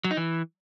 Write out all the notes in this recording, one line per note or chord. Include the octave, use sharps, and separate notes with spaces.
F#3
D#4
E3